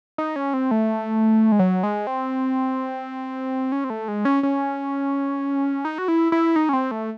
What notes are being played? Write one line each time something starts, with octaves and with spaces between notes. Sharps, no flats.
D#4
C#4
C4
A3
G#3
F#3
G#3
C4
C#4
C4
A3
G#3
C#4
C#4
D#4
F#4
E4
E4
D#4
C#4
C4
A3